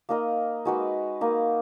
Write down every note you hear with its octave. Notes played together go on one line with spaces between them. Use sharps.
A#3 D#4 A#4 D#5
G#3 D#4 F#4 B4
A#3 D#4 A#4 D#5